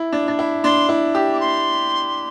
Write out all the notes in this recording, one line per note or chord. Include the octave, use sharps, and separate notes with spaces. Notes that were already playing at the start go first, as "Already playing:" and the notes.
Already playing: E4
D4
D4
E4
D4 C6
E4
G4
D6
C6